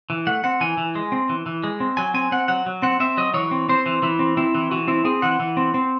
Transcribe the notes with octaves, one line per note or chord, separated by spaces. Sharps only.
E3
A3 F#5
C4 F#5
E3 G#5
E3
G#3
C4
E3
E3
G#3
C4
F#3 G#5
C4 G#5
C4 F#5
F#3 F#5
F#3
C4 F#5
C4 E5
F#3 D#5
E3 C#5
C4
C4 C5
E3
E3 E4
C4
C4 E4
E3
E3 F#4
C4 E4
C4 G#4
E3 F#5
E3
C4
C4